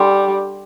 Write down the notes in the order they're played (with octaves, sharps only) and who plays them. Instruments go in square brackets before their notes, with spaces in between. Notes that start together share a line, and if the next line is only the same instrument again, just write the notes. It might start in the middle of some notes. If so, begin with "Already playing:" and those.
Already playing: [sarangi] G3 [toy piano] D4 A4 F#5 C6